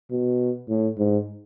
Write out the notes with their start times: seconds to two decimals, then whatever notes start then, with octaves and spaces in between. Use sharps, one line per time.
0.11 B2
0.68 A2
0.98 G#2